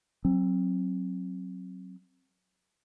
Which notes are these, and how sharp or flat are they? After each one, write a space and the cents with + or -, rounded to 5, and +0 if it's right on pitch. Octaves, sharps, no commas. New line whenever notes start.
F#3 +0 C4 +30